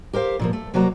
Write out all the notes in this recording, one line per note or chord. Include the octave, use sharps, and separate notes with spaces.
G4 A#4 C5 F5
A#2 F3 A#3
A3
C3 F#3 A#3 F#4 D5 A#5